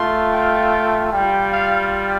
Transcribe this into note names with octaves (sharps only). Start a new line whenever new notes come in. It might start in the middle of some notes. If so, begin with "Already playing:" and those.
Already playing: A3 F4 C6
G5
G3 F4 G5
F5